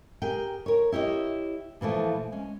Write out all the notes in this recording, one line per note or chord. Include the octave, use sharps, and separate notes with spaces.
G4 G#4 A#4 G5
A#4 C#5
E4 G4 C#5 D#5
A#2 E3 F3 A3
G#3 C#4